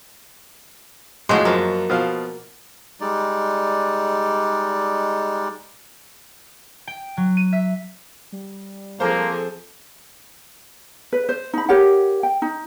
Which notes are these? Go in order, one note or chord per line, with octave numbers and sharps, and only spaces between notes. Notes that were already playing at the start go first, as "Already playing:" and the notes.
F2 A2 G#3 F#4 C6
F#2 F3 A#3
B2 F3 F5
G3 G#3 D#4 D5
G5
F#3
D#7
E5
G3
F3 A#3 C4 G#4 A4 C5
B4
C5
D#4 B5
G4 A#4 C#5 F#5
G5
D#4